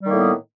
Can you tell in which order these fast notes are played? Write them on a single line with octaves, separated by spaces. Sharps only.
G3 D#3 A#3 A2 B3